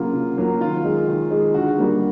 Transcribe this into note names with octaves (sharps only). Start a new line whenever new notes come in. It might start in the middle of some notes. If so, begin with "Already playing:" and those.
Already playing: C#3 F#3 A#3 F4
C#3
F#3 A#3
D#3 F4
G#3
D#3
G#3
D3 F#4
G3 A#3